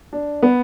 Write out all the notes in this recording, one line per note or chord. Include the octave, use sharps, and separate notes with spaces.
D4
B3